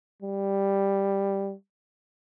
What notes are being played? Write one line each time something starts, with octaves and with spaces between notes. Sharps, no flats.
G3